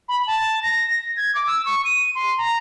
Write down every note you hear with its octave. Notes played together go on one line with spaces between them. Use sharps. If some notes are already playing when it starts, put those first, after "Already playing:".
B5
A5
A#6
A#6
G#6
D6
E6
C#6
D#7
C6
A#5